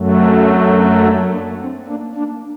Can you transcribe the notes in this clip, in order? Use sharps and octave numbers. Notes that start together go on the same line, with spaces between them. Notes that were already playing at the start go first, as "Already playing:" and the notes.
Already playing: F#2 F#3 A3
C4
C4
C4
A#3 D4
A#3 D4
C4
A#3 D4
A#3 D4